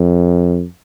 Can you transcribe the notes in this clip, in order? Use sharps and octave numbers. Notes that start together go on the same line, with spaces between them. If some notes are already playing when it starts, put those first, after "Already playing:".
Already playing: F2